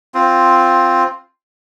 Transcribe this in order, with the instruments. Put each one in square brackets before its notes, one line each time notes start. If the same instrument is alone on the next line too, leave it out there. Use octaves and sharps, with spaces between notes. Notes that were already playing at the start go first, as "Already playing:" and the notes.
[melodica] C4 F4